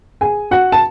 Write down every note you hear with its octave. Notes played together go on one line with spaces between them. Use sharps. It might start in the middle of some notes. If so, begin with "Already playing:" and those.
G#4 G#5
F#4 F#5
A5